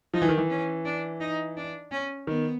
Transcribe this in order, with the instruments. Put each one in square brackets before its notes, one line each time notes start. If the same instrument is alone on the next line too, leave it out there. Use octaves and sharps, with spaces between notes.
[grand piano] F3 [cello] D#4
[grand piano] E3
D#3
E3
[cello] C#4
D4
D#4
D4
C#4
[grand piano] D#3 [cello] B3